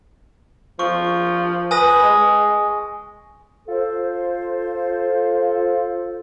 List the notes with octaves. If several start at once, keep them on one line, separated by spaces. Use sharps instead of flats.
F3 C#6
B4 G#5 D#6 A#6
G#3
F4 A4 C5